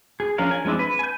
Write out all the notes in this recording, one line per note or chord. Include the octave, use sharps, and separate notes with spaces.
G#4
F3 C#4 D4 A#4 F5
G#5
F3 G#3 C4 D4 E4
B4
G#5 G6